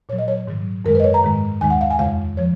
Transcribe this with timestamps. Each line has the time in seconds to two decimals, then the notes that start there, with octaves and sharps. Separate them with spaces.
0.09 A#2 F#3 C#5
0.18 D#5
0.28 C#5
0.47 G#2 D#3 F#3
0.85 F#2 D#3 G#3 A#4
0.95 B4
1.00 D#5
1.04 C#5
1.14 A#5
1.23 G#2 D#3 G#3
1.61 D#2 D#3 G#3 G#5
1.70 F#5
1.81 F5
1.90 G#5
1.99 F2 C#3 G#3 F5
2.37 F3 C#5